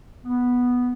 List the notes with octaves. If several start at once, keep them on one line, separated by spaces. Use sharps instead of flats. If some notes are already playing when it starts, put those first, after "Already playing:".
B3